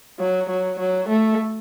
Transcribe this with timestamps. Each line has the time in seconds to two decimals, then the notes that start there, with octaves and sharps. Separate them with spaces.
0.19 F#3
0.49 F#3
0.79 F#3
1.08 A3